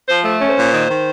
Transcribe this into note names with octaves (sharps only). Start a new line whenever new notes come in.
F3 C5
A3
C#4
C5
A#2
D#3
D#3